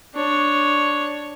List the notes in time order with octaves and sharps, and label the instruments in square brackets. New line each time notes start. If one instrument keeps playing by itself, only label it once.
[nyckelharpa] D4 C#5